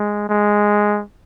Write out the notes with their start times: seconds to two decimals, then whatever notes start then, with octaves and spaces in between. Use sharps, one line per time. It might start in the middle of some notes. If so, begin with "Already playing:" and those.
Already playing: G#3
0.29 G#3